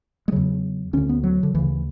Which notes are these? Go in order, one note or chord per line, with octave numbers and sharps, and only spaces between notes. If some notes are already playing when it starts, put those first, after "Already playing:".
G#3
E2 C#3 F#3
D2 D3 C#4
B3
F#3
D3
D2 C#3 E3